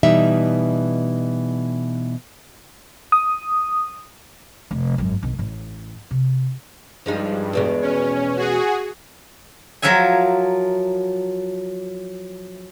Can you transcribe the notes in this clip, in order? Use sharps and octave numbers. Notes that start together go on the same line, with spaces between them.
B2 E3 G3 D#4 E5
D#6
F1
G#1 F#2
B1 D#4
A1 A2
C3
G2 F3 G#3 D#4
E2 B2 G#3
C#4
F#4 G#4
F3 F#3 A#4 E5 G#5